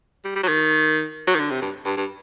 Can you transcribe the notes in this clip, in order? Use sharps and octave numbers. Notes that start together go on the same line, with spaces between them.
G3
G3
F#3
D#3
F#3
D#3
D3
C3
G2
G2
G2